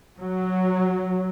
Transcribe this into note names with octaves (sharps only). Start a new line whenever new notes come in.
F#3